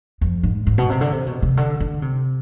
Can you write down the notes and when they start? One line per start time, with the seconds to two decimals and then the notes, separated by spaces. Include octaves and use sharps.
0.21 F2
0.43 G#2
0.67 G#2
0.78 B2
0.90 C3
1.01 D3
1.12 C3
1.27 B2
1.42 C3
1.57 D3
1.80 D3
2.02 C3